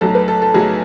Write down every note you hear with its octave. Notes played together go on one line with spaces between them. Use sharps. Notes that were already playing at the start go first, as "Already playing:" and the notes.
B1 A2 F#3 A4
B4
A4
A4
B1 A2 F#3 G#4